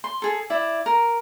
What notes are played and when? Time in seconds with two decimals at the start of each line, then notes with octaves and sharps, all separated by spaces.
0.04 C6
0.22 G#4 A4
0.50 E4 D5 E5
0.86 A#4